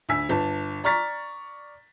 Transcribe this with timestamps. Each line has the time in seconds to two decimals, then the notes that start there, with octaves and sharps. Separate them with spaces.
0.09 D2 G#5 E6 B6
0.29 G1 A5
0.84 D5 A#5 C#6 F6 A6 B6